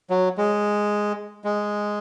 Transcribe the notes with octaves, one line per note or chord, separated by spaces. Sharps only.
F#3
G#3
G#3